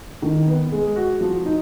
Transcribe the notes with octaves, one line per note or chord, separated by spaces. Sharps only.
D#3
B3
G#3
F#4
F3
D#4